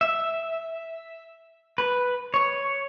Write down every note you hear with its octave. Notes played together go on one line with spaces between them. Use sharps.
E5
B4
C#5